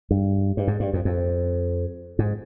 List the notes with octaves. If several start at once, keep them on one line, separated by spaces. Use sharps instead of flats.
G2
G2
G#2
G2
F2
F2
G#2